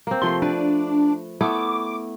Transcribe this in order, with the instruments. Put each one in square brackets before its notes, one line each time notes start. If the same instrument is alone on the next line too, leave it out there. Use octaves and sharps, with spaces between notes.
[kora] A#3 C4
[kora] C3 F3 A3 [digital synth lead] C6
[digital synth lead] D4 [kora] B4
[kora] A3 B3 E4 [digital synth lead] D6